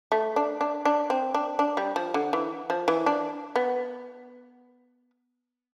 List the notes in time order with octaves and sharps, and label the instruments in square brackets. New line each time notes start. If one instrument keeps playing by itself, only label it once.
[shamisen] A3
D4
D4
D4
C4
D4
D4
G3
F3
D3
E3
F3
E3
D4
B3